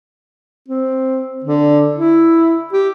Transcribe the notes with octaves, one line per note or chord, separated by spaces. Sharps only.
C4
D3
E4
G4